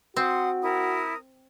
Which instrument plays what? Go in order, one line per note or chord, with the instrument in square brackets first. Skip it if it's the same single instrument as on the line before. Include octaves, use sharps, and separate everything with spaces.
[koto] C4 [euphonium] F#4 [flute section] F#5 C6 D#6
[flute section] E4 A#4 D#6